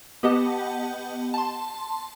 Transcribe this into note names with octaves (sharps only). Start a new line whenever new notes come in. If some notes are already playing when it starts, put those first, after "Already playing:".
B3 G4 D#5 F#5 A5
A5 C6